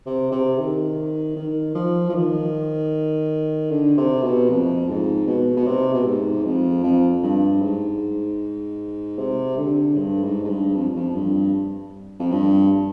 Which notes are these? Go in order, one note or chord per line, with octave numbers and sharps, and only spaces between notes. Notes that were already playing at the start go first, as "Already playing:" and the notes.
C3
C3
D#3
D#3
F3
F3
D#3
D3
C3
B2
F2
G#2
B2
B2
C3
B2
G#2
F2
F2
G2
G#2
C3
D3
G2
G#2
G#2
G2
F2
F2
G2
F2
G2